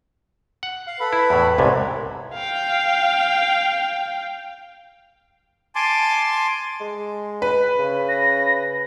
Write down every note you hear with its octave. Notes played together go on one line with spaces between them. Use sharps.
F#5
F5
A4 B4 B5
E4
E2 A2
C2 G#2 C3 C#5
F5 G5
G#5 A5 C6 D6
G#3
B4
C#3
A#6